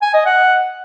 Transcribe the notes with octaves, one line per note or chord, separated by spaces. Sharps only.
G#5
D#5
F#5